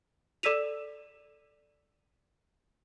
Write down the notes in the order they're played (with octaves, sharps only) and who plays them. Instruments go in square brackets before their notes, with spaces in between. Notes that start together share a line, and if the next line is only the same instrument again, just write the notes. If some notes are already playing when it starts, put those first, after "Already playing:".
[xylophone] A4 D5 E6 B6 D#7 F7